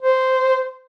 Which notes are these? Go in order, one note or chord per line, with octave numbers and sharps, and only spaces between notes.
C5